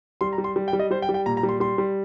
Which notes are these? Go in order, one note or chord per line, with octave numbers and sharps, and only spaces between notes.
G3 C6
A#5
G3
C6
G3
G5
G3
D#5
G3 C5
G5
G3
G5
A#2 A#5
A#5
G3
C6
G3 C6
G3